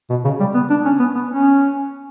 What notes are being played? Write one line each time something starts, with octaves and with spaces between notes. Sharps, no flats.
B2
C#3
G3
B3
D4
C#4
B3
B3
C#4